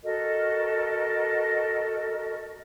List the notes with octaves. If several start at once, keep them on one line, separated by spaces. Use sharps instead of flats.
F#4 A4 A#4 D#5